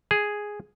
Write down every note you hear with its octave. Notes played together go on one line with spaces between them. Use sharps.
G#4